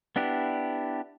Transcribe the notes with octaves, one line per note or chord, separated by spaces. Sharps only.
B3 D4 E4 G4